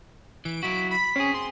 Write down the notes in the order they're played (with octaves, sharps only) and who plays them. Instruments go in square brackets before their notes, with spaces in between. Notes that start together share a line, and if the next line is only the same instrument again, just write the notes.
[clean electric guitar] E3 [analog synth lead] D7
[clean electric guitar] F#3 E4 F#4 [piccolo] B6
[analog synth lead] B5 [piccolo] B6
[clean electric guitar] C4 G#4 [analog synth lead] C#4
[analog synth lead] C6